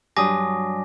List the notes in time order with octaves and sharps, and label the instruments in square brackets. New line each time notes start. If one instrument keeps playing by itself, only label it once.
[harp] G2 F#3 D#6 [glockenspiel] G#5 D6 A#6